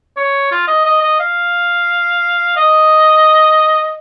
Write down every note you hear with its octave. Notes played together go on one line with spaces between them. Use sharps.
C#5
F4
D#5
D#5
D#5
F5
D#5